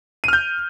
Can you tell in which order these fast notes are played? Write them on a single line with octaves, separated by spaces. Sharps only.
D#7 F6 G6